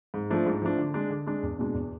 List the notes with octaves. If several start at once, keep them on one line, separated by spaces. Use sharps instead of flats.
G#2
F3 A3 D4
G#2
F3 A3 D4
D3
G#3 D4
D3
G#3 D4
E2
B2 G#3 D4
E2